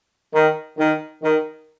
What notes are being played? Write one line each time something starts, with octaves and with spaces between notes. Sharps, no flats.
D#3
D#3
D#3